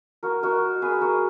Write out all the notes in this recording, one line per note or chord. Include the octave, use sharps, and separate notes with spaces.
F#4 A#4
F#4 A#4
G#4 B4
F#4 A#4